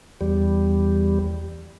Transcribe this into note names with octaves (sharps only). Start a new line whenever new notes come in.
E2 G3